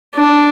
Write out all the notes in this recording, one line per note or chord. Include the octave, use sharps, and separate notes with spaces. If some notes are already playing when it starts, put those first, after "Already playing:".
D4